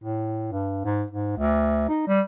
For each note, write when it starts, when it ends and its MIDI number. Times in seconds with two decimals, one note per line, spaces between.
0.04 0.50 45
0.52 0.84 43
0.85 1.04 44
1.11 1.35 44
1.37 1.86 38
1.89 2.04 63
2.08 2.21 55